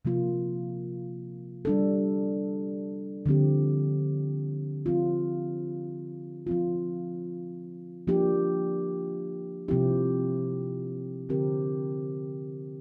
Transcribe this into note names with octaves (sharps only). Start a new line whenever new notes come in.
C3 F3 A#3 F4
G3 D4 A4
D3 F3 C4 G4
F3 C4 F4
F3 C4 F4
F3 A#3 D4 G4
C3 F3 C4 E4 G4
D3 F3 C4 G4 A#4